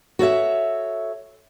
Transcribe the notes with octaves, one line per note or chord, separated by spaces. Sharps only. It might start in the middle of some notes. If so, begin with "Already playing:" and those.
F#4 A4 C#5 E5